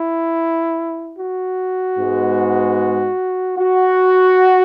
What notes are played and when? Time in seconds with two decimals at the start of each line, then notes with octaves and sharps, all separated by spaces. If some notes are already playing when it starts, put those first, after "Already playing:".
Already playing: E4
1.17 F#4
1.97 G#2 G#3 B3
3.57 F#4